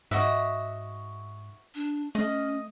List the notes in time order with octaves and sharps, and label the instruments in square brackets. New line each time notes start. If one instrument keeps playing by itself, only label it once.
[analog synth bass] G#2 [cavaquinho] F#4 D#5 E5
[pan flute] D4
[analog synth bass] A3 [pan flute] C#4 [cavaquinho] D#5